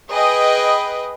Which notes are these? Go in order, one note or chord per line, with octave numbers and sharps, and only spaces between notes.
G#4 B4 D#5 G5